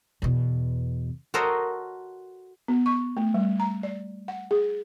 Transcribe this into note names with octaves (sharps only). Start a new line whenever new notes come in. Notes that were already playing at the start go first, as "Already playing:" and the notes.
E2 B2
F#4 A4 A#4 C5 C#5 D#5
B3
C#6
A3
G3
A#5
D5
F#5
G#4